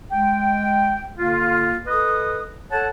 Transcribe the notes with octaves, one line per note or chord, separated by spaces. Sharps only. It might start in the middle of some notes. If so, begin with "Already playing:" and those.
G#3 G5
D3 A#3 F4
A4 B4 D#5 D#6
A4 C#5 F#5 A5